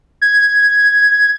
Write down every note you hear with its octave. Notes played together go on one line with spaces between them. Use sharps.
G#6